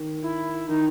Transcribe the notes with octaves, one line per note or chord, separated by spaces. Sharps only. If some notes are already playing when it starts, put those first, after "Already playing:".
Already playing: D#3
E4
D#3 D#4